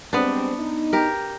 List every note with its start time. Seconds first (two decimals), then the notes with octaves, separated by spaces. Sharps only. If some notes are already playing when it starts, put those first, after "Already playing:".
0.13 G3 G#3 B3 C4 D4
0.59 D#4
0.93 G4 A#4